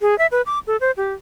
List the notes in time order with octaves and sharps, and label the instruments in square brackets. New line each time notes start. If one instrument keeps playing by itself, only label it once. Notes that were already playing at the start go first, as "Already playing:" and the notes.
[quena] G#4
E5
B4
D6
A4
C5
G4